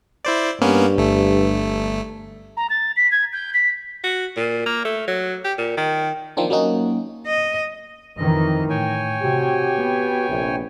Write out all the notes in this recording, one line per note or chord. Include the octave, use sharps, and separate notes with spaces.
E4 C5 D5
G2 A#3 B3 C#4
G1 A3
A#5
A6
B6
G#6
G6
B6
F#4
A#2
A#3
A3
F#3
G4
A#2
D#3
D#3 F3 A#3 C4 D4
F#3 A#3 C#4 D#4 F#4
D#5
F2 D#3 E3 D#5
A2 C#5 G5 G#5
C3 F#4 G4
B3
A#1 C3